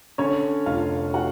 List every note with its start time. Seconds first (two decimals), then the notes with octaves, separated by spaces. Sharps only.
0.18 D3 C#4 C#5
0.66 F1 F4 F5
1.14 F#4 F#5